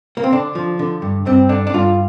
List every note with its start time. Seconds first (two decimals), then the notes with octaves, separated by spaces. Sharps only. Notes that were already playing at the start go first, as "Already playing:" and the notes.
0.17 A#3
0.24 C4
0.32 D3 D4
0.55 F3
0.79 D3
1.02 G2
1.26 G2 C4
1.49 D3 D4
1.67 D4
1.74 G2 F4